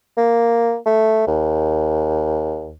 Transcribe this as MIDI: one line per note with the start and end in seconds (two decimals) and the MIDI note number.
0.17 0.76 58
0.86 1.25 57
1.27 2.76 39